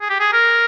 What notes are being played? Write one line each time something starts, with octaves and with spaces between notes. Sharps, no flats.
G#4
G4
G#4
A#4